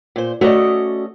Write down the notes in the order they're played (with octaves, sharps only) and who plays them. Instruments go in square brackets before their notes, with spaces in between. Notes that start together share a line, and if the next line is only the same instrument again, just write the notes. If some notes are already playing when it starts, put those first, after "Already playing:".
[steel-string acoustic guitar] A#2 C5
[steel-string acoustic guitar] A3 C#4 D#5 [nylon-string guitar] F#4 D5